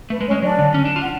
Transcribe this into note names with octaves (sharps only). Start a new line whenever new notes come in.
A3 B4
G#3
C#4 C#5
G#3
F#3 D4 D5
D3
C#4
D4
F4
F#5